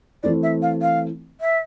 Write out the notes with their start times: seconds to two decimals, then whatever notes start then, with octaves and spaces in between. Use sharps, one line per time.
0.23 E3 A3 C4 E4 D5
0.43 E5
0.62 F5
0.82 F5
1.41 E5